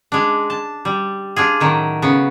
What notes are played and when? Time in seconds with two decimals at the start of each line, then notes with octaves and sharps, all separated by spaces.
0.12 G#3 D4
0.50 A5
0.85 G3
1.36 D4 F4 G#4
1.60 A2 D#3 F#3
2.02 C#3 B3